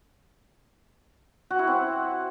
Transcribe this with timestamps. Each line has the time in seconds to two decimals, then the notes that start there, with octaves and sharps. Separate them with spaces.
1.50 F#4
1.59 E4
1.67 C4